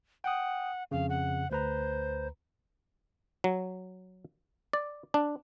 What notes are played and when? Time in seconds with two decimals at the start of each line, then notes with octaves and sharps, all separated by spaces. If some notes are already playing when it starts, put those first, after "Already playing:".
0.24 F#5 G5 D#6
0.91 F2 C#3 F5
1.10 F#5
1.51 D2 B4 C5 A#5
3.44 F#3
4.73 D5
5.14 D4